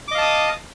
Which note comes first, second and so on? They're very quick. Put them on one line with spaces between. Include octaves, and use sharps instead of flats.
D6 D#5 F5 A5 D#6